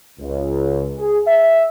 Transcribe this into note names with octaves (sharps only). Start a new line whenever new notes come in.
C#2
G#4
E5